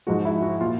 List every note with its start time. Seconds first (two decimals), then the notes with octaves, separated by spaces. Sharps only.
0.07 G#2 F3 G#3 F#4
0.25 E4
0.42 F#4
0.61 A#2 F4